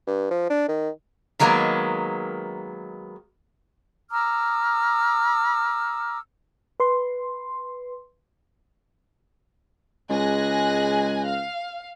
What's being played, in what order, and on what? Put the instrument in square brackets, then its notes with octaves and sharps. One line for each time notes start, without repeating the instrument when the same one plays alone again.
[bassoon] G2
F3
D4
D#3
[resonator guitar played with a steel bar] D#3 F#3 G#3 A#3 B3
[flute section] A#5 D6 E6 F6
[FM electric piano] B4 C6
[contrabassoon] C#2 [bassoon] G#3 [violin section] G#5 F#6 A#6
[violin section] F5